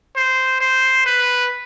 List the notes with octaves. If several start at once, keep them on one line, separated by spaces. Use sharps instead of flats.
C5
C5
B4